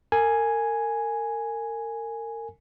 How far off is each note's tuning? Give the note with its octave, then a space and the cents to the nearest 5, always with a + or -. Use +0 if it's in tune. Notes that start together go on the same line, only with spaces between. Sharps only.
A#4 -35 G#5 +0